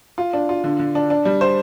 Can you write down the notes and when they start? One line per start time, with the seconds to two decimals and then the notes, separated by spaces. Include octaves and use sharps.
0.18 F4
0.33 D4
0.49 F4
0.64 D3
0.79 D3
0.95 D4
1.10 D4
1.25 G3
1.41 C5